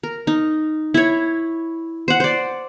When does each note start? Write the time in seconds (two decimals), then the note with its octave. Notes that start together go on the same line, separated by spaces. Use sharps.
0.03 A#4
0.27 D#4
0.94 E4 C#5
2.08 C5 F#5
2.20 C5 D5